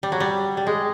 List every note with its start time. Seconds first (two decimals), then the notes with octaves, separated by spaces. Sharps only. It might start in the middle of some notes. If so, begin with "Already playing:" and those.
0.03 G3
0.12 F#3
0.20 G3
0.57 G3
0.67 G#3